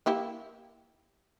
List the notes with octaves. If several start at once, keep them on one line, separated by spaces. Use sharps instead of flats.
A#3 E4 G4